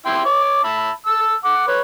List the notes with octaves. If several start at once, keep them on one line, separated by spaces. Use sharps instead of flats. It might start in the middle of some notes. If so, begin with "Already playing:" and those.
E4 G5 C6
C#5 D6
E5 A5 B5
A5 E6
F#5 D6
B4 C#5